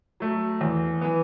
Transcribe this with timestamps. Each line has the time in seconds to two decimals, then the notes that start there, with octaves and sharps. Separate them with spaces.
0.20 F#3 A3
0.61 E2
1.01 E3 B3